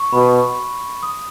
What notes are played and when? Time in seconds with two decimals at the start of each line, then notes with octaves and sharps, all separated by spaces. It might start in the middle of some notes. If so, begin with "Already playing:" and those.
Already playing: C#6
0.12 B2 B5
1.03 D#6